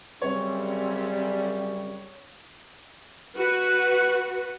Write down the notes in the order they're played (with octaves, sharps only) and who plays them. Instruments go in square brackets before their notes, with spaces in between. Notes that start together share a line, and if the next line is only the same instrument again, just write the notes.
[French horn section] F#2 C#3 G3 [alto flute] C4 [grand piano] C#5
[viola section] F#4 B4